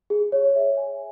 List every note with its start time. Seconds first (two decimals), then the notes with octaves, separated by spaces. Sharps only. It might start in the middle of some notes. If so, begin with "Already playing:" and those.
0.10 G#4
0.32 C#5
0.55 E5
0.77 G#5